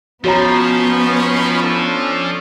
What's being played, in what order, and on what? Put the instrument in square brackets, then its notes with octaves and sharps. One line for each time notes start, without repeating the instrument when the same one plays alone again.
[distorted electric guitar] F3 [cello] B3 [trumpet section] C#4 D#4 B5 [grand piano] F#4 C#5 A#5
[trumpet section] C#4 D4 A4